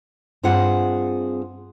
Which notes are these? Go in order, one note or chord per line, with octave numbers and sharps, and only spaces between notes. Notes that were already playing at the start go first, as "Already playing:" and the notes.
G2 C4 F4 G#4 F#5